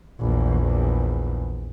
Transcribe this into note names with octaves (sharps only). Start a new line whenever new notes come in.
A#1 E2